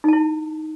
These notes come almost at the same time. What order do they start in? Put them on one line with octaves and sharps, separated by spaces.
D#4 A5 E4